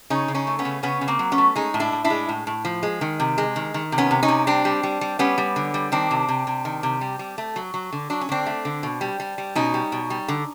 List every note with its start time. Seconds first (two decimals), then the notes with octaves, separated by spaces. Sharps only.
0.10 C#3 C#4 D#4
0.28 C#3
0.35 C#4 D#4
0.47 A3
0.59 B3 C#4
0.65 C#3
0.83 C#3 B3 C#4
1.01 C#3
1.08 A#3 C4
1.19 F#3
1.32 B3 C#4
1.38 A3
1.56 G#3 C#4 D#4
1.74 A2
1.80 D4 E4
1.92 A2
2.04 D4 E4
2.10 G#3
2.29 A2
2.47 A2
2.65 F3
2.83 G#3
3.01 D#3
3.20 C3
3.38 G#3
3.56 D#3
3.74 D#3
3.92 C3
3.98 B3 C#4
4.11 C3
4.23 C#4 D#4
4.28 C3
4.47 G3 C4 D4
4.65 G3
4.83 G3
5.01 G3
5.19 G3 B3 C#4
5.38 G3
5.56 D3
5.74 G3
5.92 D#3 C4 D4
6.11 C3
6.28 C3
6.47 C3
6.65 D#3
6.83 C3
7.01 G3
7.19 G3
7.38 A3
7.56 F#3
7.74 F#3
7.93 D3
8.10 F#3 D4
8.21 C#4
8.29 D3 C4 D4
8.46 A3
8.65 D3
8.83 B2
9.01 G3
9.20 G3
9.38 G3
9.55 B2 C#4 D#4
9.74 G3
9.92 B2
10.10 G3
10.28 D3